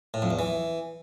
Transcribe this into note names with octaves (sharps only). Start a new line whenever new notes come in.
A2
F2
E2
E3